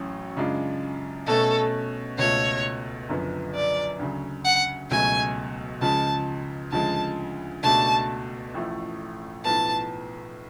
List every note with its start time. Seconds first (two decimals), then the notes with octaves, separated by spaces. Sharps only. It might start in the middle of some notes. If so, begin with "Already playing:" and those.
Already playing: A1 A2 F#3 C#4
0.36 F#2 C#3 G#3 D4 F4
1.27 B2 A3 C#4 A4
2.18 C#2 B2 A3 F4 A4 C#5
3.09 F#1 F#2 D3 F3 B3
3.55 D5
3.99 D2 C#3 F#3
4.45 F#5
4.90 C#2 B2 F#3 A3 G#5
5.81 C#2 C#3 F3 G#3 A5
6.72 D2 C#3 F3 G#3 A5
7.63 C#2 B2 A3 D4 F#4 A5
8.54 A1 A2 F3 A3
9.45 B1 A2 F3 B3 A5